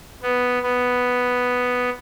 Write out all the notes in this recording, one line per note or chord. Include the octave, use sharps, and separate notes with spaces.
B3
B3